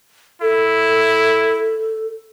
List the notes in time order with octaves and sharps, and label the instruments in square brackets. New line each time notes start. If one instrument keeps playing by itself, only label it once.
[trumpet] E4 [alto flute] A4